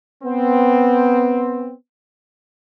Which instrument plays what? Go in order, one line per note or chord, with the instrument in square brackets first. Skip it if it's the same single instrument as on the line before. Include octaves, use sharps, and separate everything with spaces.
[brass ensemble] B3 C4